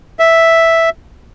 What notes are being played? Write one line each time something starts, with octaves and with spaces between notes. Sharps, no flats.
E5